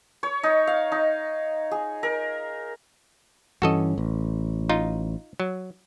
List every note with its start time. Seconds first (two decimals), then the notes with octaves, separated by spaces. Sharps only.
0.23 C#5
0.43 D#4
0.67 F5
0.92 D#4
1.71 G#4
2.03 A#4
3.62 G2 E3 C#4 F#4 A4 D#5
3.98 A1
4.69 D#4 F4
5.40 F#3